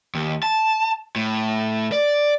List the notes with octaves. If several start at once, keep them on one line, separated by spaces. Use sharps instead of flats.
D#2
A5
A2
D5